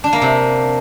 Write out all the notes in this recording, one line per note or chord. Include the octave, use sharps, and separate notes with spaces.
D4
A#3
C3